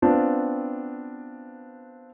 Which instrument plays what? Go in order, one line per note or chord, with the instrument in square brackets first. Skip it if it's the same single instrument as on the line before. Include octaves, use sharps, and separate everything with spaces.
[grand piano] B3 C4 D4 F4 B4